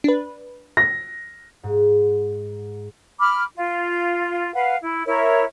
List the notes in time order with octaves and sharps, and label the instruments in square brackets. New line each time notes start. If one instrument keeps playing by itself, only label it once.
[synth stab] D4 B4
[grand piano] A#6
[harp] G#2
[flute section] B5 D6 F6
F4
B4 F5 F#5
E4
E4 A#4 C#5 E5